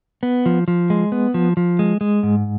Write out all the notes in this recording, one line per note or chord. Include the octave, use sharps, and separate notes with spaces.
B3
F3
F3
G#3
B3
F3
F3
G#3
G#3
G#2